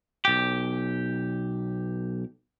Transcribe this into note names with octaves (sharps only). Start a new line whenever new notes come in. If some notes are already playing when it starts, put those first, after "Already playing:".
B1 G4